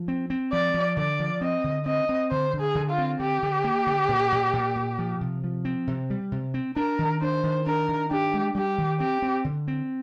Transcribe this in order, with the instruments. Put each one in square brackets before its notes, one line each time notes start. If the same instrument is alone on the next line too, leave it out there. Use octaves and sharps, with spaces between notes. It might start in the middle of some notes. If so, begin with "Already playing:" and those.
Already playing: [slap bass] F3
C4
C4
[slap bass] F3 [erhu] D5
[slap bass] F3
[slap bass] D3 [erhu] D5
[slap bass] F3
[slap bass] C4 [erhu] D#5
[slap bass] D3
[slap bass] C4 [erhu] D#5
[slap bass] C4
[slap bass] D3 [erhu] C5
[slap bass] D3
[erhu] G#4
[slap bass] D3
[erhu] F4
[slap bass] C4
[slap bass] D3 [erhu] G4
[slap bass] D3
A#3
D3
A#2
A#2
A#2
A#2
F3
C3
F3
C4
C3
G3
C3
C4
[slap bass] D4 [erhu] A#4
[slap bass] D#3
[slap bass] D4 [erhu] C5
[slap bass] D#3
[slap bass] D4 [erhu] A#4
[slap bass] D#3
[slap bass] D4 [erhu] G4
[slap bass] G#3
[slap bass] G3 [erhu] G4
[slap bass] D#3
[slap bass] C4 [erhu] G4
[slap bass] C4
D3
C4